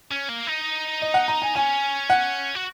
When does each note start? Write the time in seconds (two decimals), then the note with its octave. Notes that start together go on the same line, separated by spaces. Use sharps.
0.11 C#4
0.29 A#3
0.47 D#4
1.02 D#5
1.14 F#5
1.28 A#5
1.42 G#5
1.55 C#4 G#5
2.10 F#5
2.55 F#4